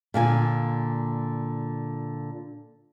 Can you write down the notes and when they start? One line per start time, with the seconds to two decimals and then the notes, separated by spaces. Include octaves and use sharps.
0.14 A#2 D3 G#5